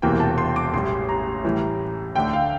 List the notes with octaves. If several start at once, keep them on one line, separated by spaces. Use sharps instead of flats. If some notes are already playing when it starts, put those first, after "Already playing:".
E1 E2 C3 E3 A#3 G5
A5
C6
D6
A1 A2 G3 C6
A#5
A2 E3 G3
D2 D3 A3 D4 G5
F5